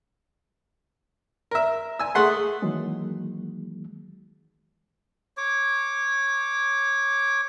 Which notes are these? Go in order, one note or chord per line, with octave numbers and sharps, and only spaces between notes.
A#4 E5
G#5 E6
A3 G#4 F#5 C6
D#3 E3 F#3 G#3 A#3
C#5 D6